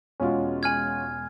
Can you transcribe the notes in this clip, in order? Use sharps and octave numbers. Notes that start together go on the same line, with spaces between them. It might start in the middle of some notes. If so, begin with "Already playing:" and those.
E1 G#3 C#4 F4 F#4
G#5 F6 G#6